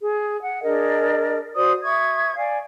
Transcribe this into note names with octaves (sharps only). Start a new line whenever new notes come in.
G#4
F#5
D4 G#4 A#4 D#5
F#4 C5 D5 D#6
E5 C#6 D#6 G#6
D5 F5 G#5